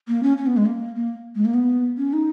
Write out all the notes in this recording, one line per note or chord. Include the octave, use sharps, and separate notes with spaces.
A#3
C#4
C#4
B3
G#3
A#3
A#3
G#3
A#3
B3
C#4
D#4